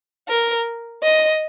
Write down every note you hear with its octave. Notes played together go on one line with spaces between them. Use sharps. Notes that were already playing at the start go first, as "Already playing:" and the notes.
A#4
D#5